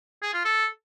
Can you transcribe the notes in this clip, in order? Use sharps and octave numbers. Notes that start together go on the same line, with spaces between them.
G#4
F4
A4